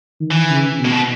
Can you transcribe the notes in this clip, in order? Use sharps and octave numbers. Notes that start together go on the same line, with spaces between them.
D#3
E3
C#3
B2
A2
B2